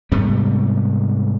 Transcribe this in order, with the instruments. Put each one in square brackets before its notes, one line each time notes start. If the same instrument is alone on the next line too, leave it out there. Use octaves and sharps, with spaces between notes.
[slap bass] G#2 C3 G3 B3